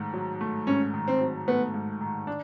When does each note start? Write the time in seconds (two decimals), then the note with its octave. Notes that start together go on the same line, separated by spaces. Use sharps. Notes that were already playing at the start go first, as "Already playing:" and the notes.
Already playing: G#2 D#3 A3
0.14 F#3
0.41 A3
0.67 G#2 C#4
0.94 D#3
1.08 C4
1.21 F#3
1.48 A3 B3
1.74 G#2
2.01 D#3
2.27 D4